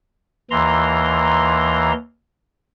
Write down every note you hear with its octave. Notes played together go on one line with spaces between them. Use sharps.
D#2 E3 A#5 C6